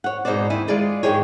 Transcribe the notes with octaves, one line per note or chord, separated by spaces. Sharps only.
C#5 F#5
G#2 B2 D#4 G#4 C5 D5
D#2 E4 G#5
G#3 F4 G#4 D5 D#5
G#2 D#3 G#3 G4 G#4 C#5